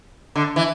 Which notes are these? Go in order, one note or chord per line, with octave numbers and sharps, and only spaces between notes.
D3
E3